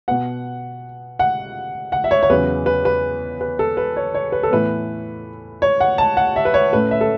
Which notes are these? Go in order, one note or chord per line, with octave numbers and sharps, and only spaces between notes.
B2 B3 F#5
F#5
F#5
E5
C#5
C#5
E2 C#3 F#3 C#4 B4
B4
B4
B4
A4
B4
C#5
C#5
B4
A4
A2 E3 B3 B4
C#5
F#5
A5
F#5
E5
B4
C#5
A2 A3 C#4 B4
E5
A4